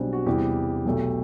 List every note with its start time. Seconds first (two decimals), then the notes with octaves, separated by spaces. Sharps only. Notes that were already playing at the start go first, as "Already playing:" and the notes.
Already playing: B1 B2 G3 C4 D4
0.13 F#4
0.26 E2 C3 G3 G4
0.85 B1 B2 A3